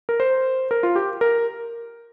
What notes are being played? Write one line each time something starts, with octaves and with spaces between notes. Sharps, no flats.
A#4
C5
A#4
F4
G4
A#4